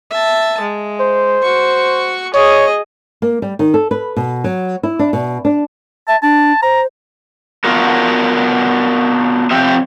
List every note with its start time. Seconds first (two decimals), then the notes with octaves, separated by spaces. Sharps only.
0.10 E5 A5
0.61 G#3
1.01 C5
1.42 F#4 C#6
2.34 G#4 C#5 D#5
3.22 A#3
3.42 G3
3.59 D#3
3.74 A4
3.91 B4
4.17 B2
4.44 F#3
4.83 E4
4.99 D4
5.13 B2
5.45 D4
6.08 E5 A5
6.22 D4 A5
6.63 C5 A#5
7.64 B3 D4 F4 F#4 A#4
9.51 C3 F3 C4 G4 C5 E5